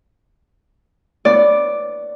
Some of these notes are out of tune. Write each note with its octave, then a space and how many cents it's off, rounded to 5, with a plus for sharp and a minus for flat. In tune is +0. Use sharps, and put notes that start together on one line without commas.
B3 +0 D5 +0